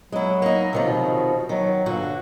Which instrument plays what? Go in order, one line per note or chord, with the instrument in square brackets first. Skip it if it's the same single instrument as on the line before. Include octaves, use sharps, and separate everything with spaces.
[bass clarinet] F#3 [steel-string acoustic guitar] G#3 E4
[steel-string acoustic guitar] A#3 D#4
[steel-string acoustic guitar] C3 D#3 F3 [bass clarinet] F#3
[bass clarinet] B2
[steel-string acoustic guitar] D#3 [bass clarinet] F#3
[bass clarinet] G2 [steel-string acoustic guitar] A#2 D3 F#4